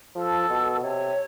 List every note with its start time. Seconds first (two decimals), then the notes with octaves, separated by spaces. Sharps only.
0.15 F3 A4
0.50 B2
0.83 C3 C#5